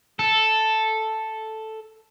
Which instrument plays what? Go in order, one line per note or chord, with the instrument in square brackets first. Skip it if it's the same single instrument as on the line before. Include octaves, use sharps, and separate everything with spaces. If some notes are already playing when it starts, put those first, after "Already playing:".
[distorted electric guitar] A4